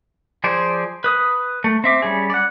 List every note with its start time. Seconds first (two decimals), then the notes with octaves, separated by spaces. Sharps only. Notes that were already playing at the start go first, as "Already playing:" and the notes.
0.44 F3 G#4 C5 D5
1.04 B4 D#6
1.64 A3
1.84 C4 E5 D6
2.02 G3 C#4 G#4
2.30 D5 F#5